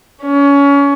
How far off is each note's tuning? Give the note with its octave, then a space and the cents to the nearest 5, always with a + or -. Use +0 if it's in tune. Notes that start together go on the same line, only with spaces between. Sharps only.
C#4 +25